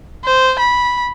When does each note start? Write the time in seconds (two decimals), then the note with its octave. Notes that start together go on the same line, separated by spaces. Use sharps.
0.24 C5
0.59 B5